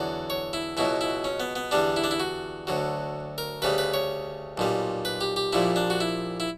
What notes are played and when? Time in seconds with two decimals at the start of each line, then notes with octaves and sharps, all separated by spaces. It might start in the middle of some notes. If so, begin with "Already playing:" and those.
Already playing: E2 D3 F#3 D5
0.30 C#5
0.53 E4
0.77 C#2 B2 F#3 E4
1.01 E4
1.24 C#4
1.40 B3
1.56 B3
1.71 E2 D3 G3 D4
1.96 E4
2.04 D4
2.11 E4
2.20 F#4
2.67 D2 D3 F#3
3.38 A#4
3.62 D2 C#3 G3 B4
3.78 B4
3.94 C#5
4.58 B1 A#2 G3
5.05 B4
5.21 G4
5.36 G4
5.53 A#1 A#2 G3 E4
5.76 D4
5.90 F#4
6.00 E4
6.40 E4